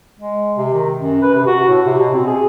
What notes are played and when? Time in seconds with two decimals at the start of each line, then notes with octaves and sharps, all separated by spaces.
0.19 G#3
0.57 C3
0.73 D#3
0.99 F#2
1.22 B4
1.35 C3
1.47 F#4
1.68 A2
1.86 C3
2.00 B2
2.14 C4
2.27 G#4